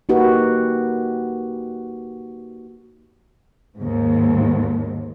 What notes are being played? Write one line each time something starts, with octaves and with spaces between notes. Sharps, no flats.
A#3 D#4 F#4 G4 B4
D#2 G#2